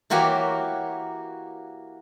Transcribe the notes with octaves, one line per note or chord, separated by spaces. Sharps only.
E3 A#3 F#4 G4 C#5 A#5